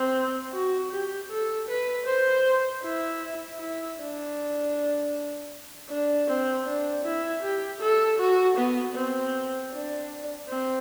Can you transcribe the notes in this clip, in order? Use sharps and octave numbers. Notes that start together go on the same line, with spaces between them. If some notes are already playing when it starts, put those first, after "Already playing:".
Already playing: C4
F#4
G4
A4
B4
C5
E4
E4
D4
D4
C4
D4
E4
G4
A4
F#4
B3
C4
D4
C4